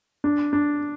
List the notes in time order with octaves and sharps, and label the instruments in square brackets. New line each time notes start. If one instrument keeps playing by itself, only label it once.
[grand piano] D4
D4